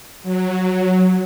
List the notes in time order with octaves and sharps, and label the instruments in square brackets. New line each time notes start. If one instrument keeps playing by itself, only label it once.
[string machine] F#3